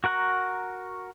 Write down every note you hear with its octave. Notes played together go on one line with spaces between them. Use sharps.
F#4 A#4 F#5 A#5 C#6